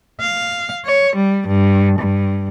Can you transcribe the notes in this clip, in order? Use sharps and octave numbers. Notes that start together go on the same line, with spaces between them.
F5
C#5
G3
G2
G2